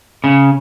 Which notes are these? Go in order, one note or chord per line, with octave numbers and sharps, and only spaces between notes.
C#3